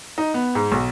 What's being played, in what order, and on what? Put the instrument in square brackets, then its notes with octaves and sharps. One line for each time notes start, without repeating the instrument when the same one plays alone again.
[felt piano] D#4
B3
G#2
B1